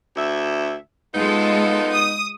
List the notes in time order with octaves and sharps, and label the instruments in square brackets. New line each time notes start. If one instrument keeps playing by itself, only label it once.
[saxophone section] D2 E5
[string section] G#3 F4 A4 [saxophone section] B3 D#4
[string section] D#6